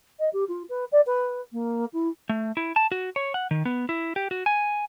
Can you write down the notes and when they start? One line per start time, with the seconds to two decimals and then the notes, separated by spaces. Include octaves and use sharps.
0.20 D#5
0.33 G4
0.48 F4
0.69 B4
0.92 D5
1.06 B4
1.53 A#3
1.93 E4
2.29 A3
2.57 E4
2.76 A5
2.92 F#4
3.16 C#5
3.34 F#5
3.51 D#3
3.65 B3
3.89 E4
4.16 G4
4.31 F#4
4.46 G#5